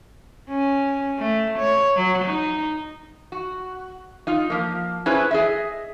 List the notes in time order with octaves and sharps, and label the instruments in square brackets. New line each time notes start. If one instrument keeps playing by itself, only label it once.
[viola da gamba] C#4
A3
C#5
F#3
D#4
[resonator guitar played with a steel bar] F#4
D#4 F4
F3 A#3
C#4 E4 G#4 B4 C5
G#4 D#5 E5